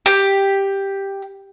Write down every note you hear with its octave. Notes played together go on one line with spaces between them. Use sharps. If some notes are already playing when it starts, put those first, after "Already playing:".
G4